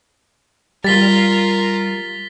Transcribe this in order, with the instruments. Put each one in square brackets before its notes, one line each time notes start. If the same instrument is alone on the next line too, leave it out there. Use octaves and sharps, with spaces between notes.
[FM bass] G3 [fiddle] F4 A#4 [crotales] A6 B6 G7